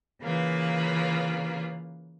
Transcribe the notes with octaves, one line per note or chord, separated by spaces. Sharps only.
C#3 E3 A#3 F4 B4